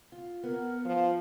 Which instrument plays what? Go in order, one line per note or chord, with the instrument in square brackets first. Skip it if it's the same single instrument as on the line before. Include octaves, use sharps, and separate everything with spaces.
[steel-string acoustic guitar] F4
[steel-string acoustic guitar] B3 [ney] A#4
[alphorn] F3 [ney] F5